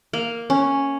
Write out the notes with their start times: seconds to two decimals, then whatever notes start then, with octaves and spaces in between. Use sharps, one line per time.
0.13 A#3
0.50 C#4